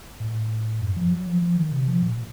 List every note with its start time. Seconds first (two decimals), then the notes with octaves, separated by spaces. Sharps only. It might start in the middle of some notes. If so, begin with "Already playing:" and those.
0.20 A2
0.81 F#2
0.97 F3
1.11 F#3
1.26 F3
1.42 F3
1.57 D#3
1.72 C3
1.88 F3
2.02 A#2